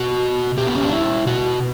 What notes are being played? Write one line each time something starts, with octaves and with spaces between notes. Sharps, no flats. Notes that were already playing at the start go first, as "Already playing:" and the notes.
Already playing: B2 F#4
B2 G4
B3
C#4
D4
E4
B2 F#4